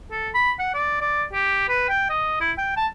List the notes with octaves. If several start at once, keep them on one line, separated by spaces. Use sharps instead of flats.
A4
B5
F#5
D5
D5
G4
B4
G5
D#5
E4
G5
A5